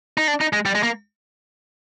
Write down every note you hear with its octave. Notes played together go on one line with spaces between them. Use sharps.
D#4
D4
D#4
G#3
G3
G#3
A#3